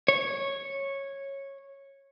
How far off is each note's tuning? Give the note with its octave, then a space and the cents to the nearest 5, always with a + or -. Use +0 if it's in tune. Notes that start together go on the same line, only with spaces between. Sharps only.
C#5 -10